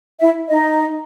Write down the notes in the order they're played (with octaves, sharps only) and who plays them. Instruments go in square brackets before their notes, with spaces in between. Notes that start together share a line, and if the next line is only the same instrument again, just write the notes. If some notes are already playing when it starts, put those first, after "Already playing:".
[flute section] E4 E5
D#4 D#5